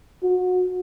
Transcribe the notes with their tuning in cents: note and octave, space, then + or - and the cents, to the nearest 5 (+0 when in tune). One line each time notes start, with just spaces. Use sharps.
F#4 -25